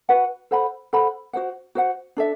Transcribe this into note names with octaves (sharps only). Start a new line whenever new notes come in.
F#4 B4 F#5
A4 C5 F#5 B5
A4 C5 F#5 B5
F#4 C5 F#5
F#4 C5 F#5
D4 A4 E5